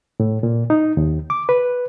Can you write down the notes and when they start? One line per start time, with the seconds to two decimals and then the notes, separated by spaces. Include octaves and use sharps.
0.20 A2
0.43 A#2
0.70 D#4
0.97 D#2
1.30 D6
1.49 B4